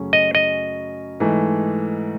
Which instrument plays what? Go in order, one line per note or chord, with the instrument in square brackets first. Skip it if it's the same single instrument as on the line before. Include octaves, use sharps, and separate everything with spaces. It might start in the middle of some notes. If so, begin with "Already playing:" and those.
Already playing: [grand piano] F#2 C#3 F#3 A3 C#4
[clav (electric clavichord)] D#5
D#5
[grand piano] G#2 E3 A3